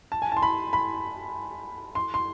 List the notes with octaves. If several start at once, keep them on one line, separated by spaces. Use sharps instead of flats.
A5
G#5
A5
C6
B5
B5
C6
C6